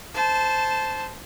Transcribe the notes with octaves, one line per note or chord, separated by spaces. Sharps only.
C5 A5